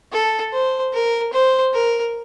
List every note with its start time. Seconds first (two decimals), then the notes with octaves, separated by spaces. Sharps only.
0.12 A4
0.53 C5
0.93 A#4
1.33 C5
1.73 A#4